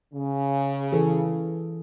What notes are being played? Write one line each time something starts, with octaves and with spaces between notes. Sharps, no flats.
C#3
E3 G#4 A4